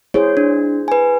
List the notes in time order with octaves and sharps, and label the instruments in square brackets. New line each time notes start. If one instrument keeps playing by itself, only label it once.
[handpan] E4 G#4 C5 [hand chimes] C#5
[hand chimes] D4
B4 G#5